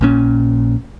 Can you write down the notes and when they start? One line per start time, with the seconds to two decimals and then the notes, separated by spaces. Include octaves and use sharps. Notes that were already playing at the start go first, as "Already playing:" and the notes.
0.01 A#1 A#2 C#4